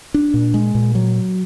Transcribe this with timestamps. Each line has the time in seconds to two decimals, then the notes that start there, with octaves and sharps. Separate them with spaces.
0.14 D4
0.34 A#2
0.54 G#3
0.75 A#2
0.95 F#3